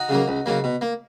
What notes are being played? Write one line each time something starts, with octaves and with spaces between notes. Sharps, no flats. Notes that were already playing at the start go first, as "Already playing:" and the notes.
Already playing: D#4 F#4
C#3 F#3 A#3
C#2
C#3 F#3 A#3
B2
A#3